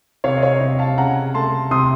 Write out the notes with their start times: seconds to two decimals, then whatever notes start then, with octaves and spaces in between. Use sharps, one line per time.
0.24 C3 C#5 F5
0.37 D#5
0.42 C#5 F5
0.61 C3
0.79 F5 A5
0.98 C#3 F#5 A#5
1.34 A3 A5 C6
1.71 C3 C6 D#6